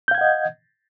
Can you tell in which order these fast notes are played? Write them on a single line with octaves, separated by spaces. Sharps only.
G6 F5 G#6 F#5 D#5